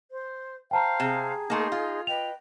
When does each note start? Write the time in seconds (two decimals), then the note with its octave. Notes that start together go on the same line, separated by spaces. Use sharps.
0.11 C5
0.71 C5 F5 G5 A5 A#5
1.00 C3 G#4
1.50 A3 A#3 D#4 C6
1.72 F4
2.07 B4 D#5 G5 F7